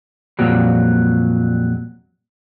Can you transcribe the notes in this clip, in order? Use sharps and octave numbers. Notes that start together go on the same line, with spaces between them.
F2 A#2 F#3 G3